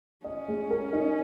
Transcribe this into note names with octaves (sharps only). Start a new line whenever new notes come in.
C#4 D#5
G#3
A#4
D#4